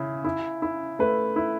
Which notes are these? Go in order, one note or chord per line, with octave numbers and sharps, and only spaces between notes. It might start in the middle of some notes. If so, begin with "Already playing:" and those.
Already playing: C#3 E4
E4
E4
A3 B4
E4